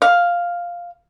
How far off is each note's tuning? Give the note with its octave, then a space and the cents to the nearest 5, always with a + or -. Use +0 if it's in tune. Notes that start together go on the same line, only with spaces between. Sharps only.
F5 +0